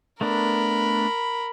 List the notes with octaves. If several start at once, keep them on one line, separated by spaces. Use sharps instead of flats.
A3 B3 D4 A#4 B5